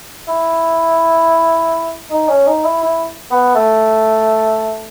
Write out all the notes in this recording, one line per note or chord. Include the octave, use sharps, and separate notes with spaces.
E4
D#4
C#4
D#4
E4
E4
B3
A3